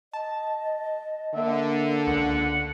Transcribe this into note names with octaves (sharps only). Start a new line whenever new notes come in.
D#5 A5
D3 A#3 E5
C#2 F#5